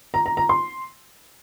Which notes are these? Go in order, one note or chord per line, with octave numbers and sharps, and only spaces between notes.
A#5
A#5
A#5
C6